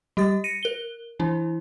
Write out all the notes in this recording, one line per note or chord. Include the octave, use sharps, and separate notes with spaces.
G3 G4 D#6 A6
A#6 C#7 D#7
A#4 G7
E3 D4 E4